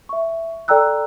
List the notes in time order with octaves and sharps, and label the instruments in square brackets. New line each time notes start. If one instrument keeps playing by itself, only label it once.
[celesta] E5 C#6
A4 D5 G5 A#5 E6 F#6